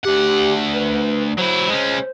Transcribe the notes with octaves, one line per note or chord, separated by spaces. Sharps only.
D2 G4 F#5
B4
F#3 E4 C5
G#3 C#4